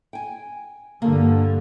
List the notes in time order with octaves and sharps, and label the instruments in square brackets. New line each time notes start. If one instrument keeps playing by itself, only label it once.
[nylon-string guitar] G5 G#5
[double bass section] G2 D3 [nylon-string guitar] A#3